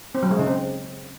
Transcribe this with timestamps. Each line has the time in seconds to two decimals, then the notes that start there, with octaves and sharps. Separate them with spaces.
0.15 C4
0.23 F#3
0.31 G#3
0.39 C#3
0.47 C4